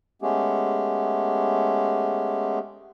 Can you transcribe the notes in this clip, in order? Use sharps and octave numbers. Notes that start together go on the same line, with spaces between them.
G#3 A3 B3 C#4 G4 G#4